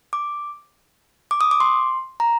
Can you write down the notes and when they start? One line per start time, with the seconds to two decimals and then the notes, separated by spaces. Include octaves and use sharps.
0.13 D6
1.31 D6
1.41 D#6
1.51 D6
1.60 C6
2.20 A#5